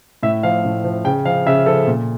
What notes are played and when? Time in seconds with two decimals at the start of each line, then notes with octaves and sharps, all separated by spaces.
0.23 A2 E5
0.43 F3 F5
0.65 A2
0.84 F3
1.04 C#3 G5
1.25 F3 F5
1.46 C#3 E5
1.66 F3 A4
1.87 A#2